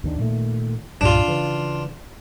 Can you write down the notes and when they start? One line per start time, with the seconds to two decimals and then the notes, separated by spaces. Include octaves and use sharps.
0.03 D#2 D#3 D4
0.19 A#2 D#3 A3
1.01 C2 G2 A#2 D4 F4
1.28 C#3 E3